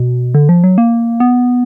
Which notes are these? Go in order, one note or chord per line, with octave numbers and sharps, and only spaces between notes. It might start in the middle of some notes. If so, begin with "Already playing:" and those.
Already playing: B2
D3
F3
F#3
A#3
B3